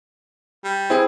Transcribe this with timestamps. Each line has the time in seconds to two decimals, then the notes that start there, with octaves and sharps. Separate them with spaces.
0.64 G3
0.90 C4 E4 G#4